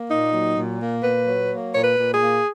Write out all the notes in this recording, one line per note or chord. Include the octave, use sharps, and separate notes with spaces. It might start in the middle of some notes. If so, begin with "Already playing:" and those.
Already playing: A#3
A#2 D#4
F#3
A#2
A#3
A#2 B4
F#3
A#3
A#2 C#5
B4
A#2
G#4
A#3